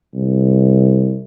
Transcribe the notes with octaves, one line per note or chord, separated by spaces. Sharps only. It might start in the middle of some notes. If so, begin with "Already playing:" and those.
C2